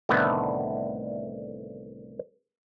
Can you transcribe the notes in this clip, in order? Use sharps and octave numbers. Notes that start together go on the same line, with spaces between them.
C2 A2 D3 D#3 A3 B3